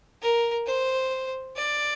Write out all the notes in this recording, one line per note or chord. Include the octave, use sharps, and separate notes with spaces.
A#4
C5
D5